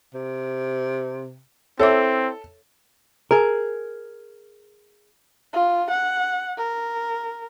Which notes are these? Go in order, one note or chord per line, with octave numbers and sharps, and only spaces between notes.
C3
C4 E4 A4 C#5 E5 D6
G#4 A#4
F4
F#5
A#4